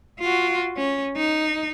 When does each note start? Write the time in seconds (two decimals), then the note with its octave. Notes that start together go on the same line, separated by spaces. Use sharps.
0.19 F4 F#4
0.77 C#4
1.17 D#4